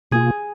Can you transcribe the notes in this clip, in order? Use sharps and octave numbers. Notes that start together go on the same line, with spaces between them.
B2 A#3 F4 G#4